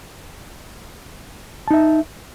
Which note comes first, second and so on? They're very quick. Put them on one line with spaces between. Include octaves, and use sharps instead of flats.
A5 D#4 E5